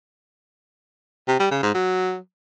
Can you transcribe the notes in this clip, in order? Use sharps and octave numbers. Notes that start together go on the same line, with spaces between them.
C3
G3
C#3
G#2
F#3